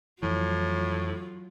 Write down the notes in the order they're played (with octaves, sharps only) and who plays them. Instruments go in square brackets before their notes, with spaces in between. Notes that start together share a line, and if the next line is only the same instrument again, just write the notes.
[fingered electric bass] F2 E3 [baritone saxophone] A2 [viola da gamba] F#3 F4